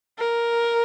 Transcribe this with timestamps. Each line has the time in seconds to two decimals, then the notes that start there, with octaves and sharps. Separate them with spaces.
0.19 A#4